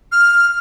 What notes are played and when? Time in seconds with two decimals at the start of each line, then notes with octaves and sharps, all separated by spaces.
0.12 F6